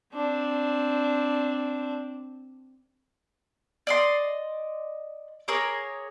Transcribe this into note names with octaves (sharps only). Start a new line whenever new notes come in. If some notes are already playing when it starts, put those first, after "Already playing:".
C4 D4
D5 D#5 C6
G#4 A#4 C#5 D6